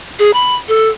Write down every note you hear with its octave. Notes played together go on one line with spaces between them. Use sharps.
G#4
B5
A4